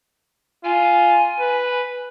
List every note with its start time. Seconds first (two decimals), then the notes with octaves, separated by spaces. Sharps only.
0.65 F4 G#5
1.40 B4